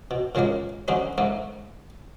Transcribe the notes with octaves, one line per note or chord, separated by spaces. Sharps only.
B2
A#2 C#3 G#3 A#3 A#4
D3 G3 C4 C#4 D#4
G#2 A3 A#3